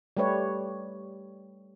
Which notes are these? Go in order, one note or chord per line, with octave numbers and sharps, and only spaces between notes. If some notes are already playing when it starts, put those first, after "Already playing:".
G3 A3 G4 B4 C#5